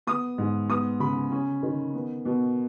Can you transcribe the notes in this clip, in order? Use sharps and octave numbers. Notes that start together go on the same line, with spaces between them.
B3 D#6
G#2
B3 D#6
C#3 B5
C#4
D#3
B3
B2